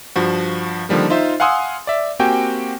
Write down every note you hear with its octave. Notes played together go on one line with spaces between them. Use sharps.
G2 F3 F#4
D3 D#3 F3 G3 A#3
D#4 F4 C5 E5
F5 F#5 G#5 C6 D#6 E6
D5 E5
A#3 C4 F#4 G4 G5 G#5